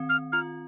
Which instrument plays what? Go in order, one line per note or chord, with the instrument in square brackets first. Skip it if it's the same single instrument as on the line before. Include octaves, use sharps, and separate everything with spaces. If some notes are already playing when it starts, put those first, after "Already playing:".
Already playing: [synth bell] D#3 C4
[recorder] F6
[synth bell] F4 [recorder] F6